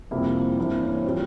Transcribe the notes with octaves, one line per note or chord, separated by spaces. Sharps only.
F2 C3 G3 A#3 E4
G2 E3 A#3 C4
C#4
A#2 G3 C4